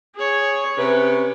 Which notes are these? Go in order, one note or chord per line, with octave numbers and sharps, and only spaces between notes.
G#4 C#5
C3 C#4 B4